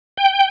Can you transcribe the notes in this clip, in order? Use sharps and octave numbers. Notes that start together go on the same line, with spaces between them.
G5